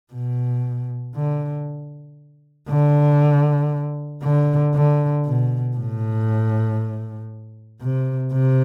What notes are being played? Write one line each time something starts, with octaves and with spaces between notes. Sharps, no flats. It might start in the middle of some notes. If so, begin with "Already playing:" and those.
B2
D3
D3
D3
D3
B2
A2
C3
C3